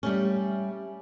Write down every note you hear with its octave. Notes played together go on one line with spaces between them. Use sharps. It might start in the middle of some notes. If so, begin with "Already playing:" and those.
G3 A3 C#4